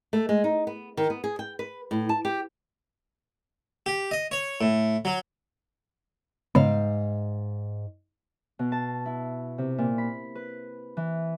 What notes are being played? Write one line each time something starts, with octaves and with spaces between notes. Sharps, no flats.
A3
G#3
D#4
B3
D#3
B3
G#4
G5
B4
A2
A5
G4
G4
D#5
C#5
A2
F#3
G#2 C#3 B3 F5
B2
A5
E4
C3
A#2
B5
B4
E3